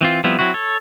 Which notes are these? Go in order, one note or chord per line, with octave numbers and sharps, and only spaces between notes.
E3 C4 F4
F3 G3 B3 C4 E4
F#3 C4 E4 F#4
A4 C#5